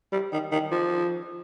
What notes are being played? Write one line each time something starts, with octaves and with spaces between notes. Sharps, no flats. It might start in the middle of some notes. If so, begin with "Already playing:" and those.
G3
D#3
D#3
F3